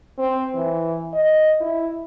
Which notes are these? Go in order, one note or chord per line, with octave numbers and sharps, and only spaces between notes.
C4
E3
D#5
E4